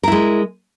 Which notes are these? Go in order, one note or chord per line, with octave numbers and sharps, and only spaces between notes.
G#3 E4 A#4